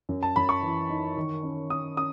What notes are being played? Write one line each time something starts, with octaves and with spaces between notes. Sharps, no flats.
F#2
A5
F#2 B5
C#6
E3
D#4
D#3
C#4
C#4 D#6
C#4 D#6